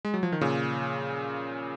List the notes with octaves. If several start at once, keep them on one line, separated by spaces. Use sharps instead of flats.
G#3
F#3
F3
D#3
A#2 C#3